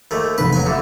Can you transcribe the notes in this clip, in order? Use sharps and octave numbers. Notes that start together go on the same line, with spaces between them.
D#2 A3
F1 E2 G#2 B4
F#3 G#5
A1 D3 A4 E5